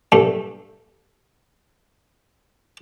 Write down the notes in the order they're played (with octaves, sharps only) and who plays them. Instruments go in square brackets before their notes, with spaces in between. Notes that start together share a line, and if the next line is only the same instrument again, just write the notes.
[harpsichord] G2 A3